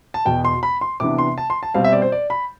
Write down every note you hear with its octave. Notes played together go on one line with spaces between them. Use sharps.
A5
E2 B2 B3 G5
C6
B5
C6
C3 E3 B3 D4 D6
C6
A5
C6
A5
B2 G3 C4 F5
E5
D5
C5
D5
B5